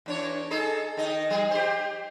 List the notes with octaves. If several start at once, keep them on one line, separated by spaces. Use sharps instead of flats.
E2 D4 C#5
D#4 G#4 A4
D#3 D#5
G3 G#4
G4 C5